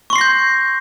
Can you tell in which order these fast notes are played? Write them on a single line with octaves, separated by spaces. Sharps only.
C#6 C6 C7 A#6 G6